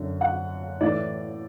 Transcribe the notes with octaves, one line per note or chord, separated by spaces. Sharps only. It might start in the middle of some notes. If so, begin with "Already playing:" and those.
Already playing: F#2 D3
F#5
A2 E3 D5